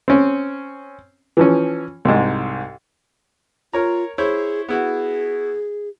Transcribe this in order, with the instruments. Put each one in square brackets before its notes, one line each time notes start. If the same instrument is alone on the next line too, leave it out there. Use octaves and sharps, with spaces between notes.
[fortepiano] C4 C#4
E3 F3 C#4
C2 G#2
[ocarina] F4 [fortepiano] A#4 C#5 A#5
[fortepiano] E4 C5 C#5 [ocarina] G#4
[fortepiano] B3 E4 F#4 [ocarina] G#4